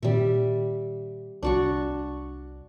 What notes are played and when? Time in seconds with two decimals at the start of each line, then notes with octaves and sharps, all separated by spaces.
0.03 A#2 D#3 G3 C4 E5
1.43 C2 D4 F#4 C#6